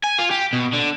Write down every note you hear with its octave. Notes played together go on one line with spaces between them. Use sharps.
G#5
F4
G4
B2
D3